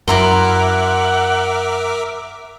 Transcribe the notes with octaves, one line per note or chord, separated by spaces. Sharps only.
F#2 E4 A#4 E5 F#5 A#5 C6 D6